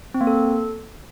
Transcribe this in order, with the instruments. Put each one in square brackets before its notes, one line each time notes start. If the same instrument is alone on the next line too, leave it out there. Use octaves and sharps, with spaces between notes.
[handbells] C4
A#3
A4